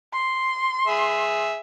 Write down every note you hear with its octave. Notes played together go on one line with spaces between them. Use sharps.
C6
G#4 E5